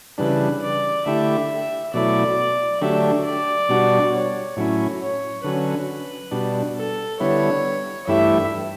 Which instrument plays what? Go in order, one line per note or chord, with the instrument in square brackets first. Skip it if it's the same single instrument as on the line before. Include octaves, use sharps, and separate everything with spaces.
[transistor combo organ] C#3 E3 G3 D4 [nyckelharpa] B4
[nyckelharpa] D5
[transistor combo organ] D3 A3 E4 G4 [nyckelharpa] E5
[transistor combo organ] B2 F#3 A3 E4 [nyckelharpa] D5
[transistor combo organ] D3 F#3 A3 D4 G4 [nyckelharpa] E5
[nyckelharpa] D5
[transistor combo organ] B2 G3 D4 F#4
[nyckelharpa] C#5
[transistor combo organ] A2 F#3 C#4 E4
[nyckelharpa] C#5
[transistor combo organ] D3 F#3 C#4 [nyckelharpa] B4
[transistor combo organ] B2 G3 D4
[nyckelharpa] A4
[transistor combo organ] D3 G3 B3 E4 [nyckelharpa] C#5
[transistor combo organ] G2 E3 A3 E4 G4 [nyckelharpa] E5